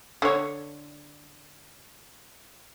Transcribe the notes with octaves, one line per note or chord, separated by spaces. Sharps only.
D3 C#5